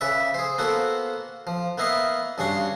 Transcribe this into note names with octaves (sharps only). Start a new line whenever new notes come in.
C#3 B4 D5 E5
G#4 C5
A#3 B3 F#4 A4 C5
F3
A#3 B3 E4 D#5 F5
G2 C#3 D4 F#4 C6 C#6